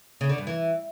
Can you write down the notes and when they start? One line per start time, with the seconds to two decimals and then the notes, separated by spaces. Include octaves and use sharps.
0.21 C#3
0.29 D3
0.38 G2
0.47 E3